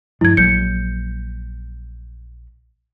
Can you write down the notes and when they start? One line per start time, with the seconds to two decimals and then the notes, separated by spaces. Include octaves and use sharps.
0.21 G2 F3 G#3 E4 G#6
0.37 A#1 F#3 G#3 G6 C#7